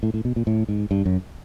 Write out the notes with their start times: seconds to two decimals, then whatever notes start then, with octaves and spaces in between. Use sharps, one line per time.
0.03 A2
0.14 A2
0.25 B2
0.36 A#2
0.47 A2
0.69 G#2
0.91 G2
1.06 F#2